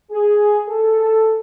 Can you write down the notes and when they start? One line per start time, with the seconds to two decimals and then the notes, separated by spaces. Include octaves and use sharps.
0.11 G#4
0.69 A4